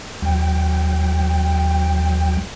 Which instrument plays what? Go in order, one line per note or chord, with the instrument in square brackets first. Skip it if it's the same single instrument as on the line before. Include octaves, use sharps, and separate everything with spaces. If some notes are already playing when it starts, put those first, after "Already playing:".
[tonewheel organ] D#2 F#3 G5